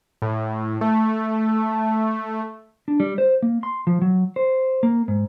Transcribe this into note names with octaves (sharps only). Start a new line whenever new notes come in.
A2
A3
D4
G3
C5
A#3
C6
F3
F#3
C5
A#3
G#2